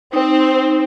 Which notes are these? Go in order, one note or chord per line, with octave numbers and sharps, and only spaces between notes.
C4 D#4